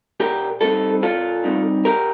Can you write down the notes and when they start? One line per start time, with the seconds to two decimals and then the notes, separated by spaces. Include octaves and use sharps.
0.20 A#2 G4 A#4
0.61 G3 C4 D#4 F4 A4
1.02 A#2 F4 A4
1.44 G3 C4 D#4
1.85 A#2 G4 A#4